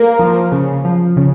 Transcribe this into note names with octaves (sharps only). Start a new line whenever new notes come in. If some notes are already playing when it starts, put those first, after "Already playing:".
Already playing: A#3 A#4
F3
C#3
F3
C#3